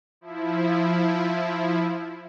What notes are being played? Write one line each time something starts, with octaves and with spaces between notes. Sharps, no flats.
F3 E4